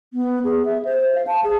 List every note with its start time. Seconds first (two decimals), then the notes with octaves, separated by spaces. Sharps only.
0.14 B3
0.44 G#4
0.65 E5
0.85 C5
1.15 F5
1.27 A5
1.44 G#4